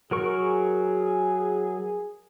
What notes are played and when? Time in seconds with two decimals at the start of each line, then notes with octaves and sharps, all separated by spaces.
0.11 F#3 G#4 A#4 C#6